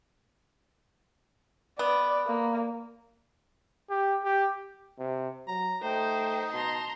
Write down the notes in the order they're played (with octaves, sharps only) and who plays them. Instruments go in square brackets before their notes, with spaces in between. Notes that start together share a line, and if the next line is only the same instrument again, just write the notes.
[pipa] B3 [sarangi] D5
[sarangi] A#3
[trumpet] G4
G4
[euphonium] C3
[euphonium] F#3 [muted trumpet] A#5
[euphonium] A3 [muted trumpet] D#4 [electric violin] C5 [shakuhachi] G5
[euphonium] B2 [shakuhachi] A5 [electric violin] A#5 C6